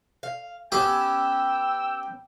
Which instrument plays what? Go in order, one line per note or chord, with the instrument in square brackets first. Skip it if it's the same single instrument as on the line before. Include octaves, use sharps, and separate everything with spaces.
[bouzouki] F5
[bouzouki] B3 C#4 [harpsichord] G4 [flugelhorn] G5 [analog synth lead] E6